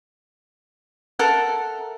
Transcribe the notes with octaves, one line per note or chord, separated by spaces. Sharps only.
A4 A#4 E5 F#5